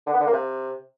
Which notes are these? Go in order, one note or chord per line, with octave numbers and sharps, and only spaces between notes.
D3
B3
D3
A#3
C3